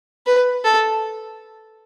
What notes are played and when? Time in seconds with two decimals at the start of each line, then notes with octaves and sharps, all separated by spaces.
0.26 B4
0.64 A4